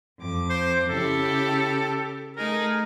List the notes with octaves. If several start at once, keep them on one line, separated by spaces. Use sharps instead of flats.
F2 D6
C5
C#3 E4 G4 A4
A3 D#4 G#4 A#4